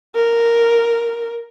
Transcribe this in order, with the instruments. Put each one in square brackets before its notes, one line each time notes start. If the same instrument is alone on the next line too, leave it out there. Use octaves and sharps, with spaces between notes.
[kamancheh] A#4